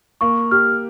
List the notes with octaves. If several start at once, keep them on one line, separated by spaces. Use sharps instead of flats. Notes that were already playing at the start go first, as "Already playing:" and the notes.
A#3 C#6
G4 F6